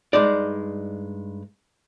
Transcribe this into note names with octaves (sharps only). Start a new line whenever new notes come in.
G2 G#3 D#4 D5